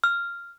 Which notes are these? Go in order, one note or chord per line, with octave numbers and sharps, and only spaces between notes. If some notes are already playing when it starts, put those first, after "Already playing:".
F6